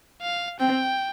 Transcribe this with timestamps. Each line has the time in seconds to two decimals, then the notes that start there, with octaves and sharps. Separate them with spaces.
0.21 F5
0.60 C4 G5